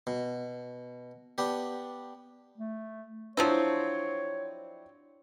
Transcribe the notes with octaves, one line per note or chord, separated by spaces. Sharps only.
B2
B3 D4 G4
A3
F3 F#3 C4 D4 E4 C#5